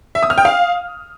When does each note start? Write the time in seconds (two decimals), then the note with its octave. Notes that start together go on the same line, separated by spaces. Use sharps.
0.15 E5
0.23 D#6
0.30 F6
0.38 G5
0.45 F5